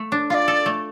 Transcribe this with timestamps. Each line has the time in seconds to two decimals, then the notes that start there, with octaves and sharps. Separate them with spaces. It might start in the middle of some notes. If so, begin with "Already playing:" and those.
Already playing: A3
0.12 D4
0.30 F4 F5
0.34 D5
0.48 A4
0.66 A3